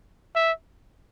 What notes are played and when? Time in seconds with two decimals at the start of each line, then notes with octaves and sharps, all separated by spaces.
0.35 E5